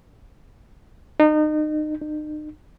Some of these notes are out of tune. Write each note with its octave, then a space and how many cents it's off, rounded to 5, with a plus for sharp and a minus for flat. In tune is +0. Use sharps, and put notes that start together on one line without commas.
D#4 -30
D#4 -40